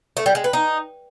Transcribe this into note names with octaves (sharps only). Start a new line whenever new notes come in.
A3
G3
G#3
B4
D#4